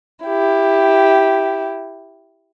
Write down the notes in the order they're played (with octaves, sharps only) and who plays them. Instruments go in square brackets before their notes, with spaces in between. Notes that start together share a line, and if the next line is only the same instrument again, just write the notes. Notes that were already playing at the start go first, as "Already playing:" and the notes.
[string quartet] E4 G4